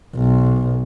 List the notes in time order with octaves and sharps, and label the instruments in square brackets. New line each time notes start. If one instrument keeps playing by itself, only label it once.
[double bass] B1